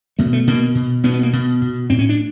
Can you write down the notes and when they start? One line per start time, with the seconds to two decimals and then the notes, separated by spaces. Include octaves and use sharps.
0.19 B2 A3
0.33 A3
0.47 B2 A#3
0.75 B2
1.03 B2 B3
1.14 B3
1.23 A#3
1.33 B2
1.61 B2
1.90 A2 C4
1.99 C#4
2.09 D4